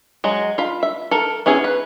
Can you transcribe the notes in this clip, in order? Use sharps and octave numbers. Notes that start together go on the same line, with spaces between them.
F#3 G#3
F4 B5
E5
A4 A#4
B3 C#4 E4 G#4
B4